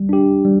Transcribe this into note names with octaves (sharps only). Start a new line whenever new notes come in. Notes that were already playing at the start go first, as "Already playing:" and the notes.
Already playing: G3
D4 G4
G3